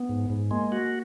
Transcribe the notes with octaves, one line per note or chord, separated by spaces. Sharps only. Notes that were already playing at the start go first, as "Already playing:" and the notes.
Already playing: B3
G#2
G#2
G#3 A#3
F#4